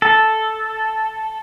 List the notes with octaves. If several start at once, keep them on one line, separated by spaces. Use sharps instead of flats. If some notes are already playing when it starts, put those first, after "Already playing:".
A4